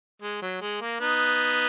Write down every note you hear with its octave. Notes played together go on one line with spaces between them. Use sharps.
G#3
F#3
G#3
A#3
B3 D#4